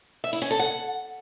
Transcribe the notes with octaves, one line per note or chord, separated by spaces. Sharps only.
E5
E4
C#4
A4
F#5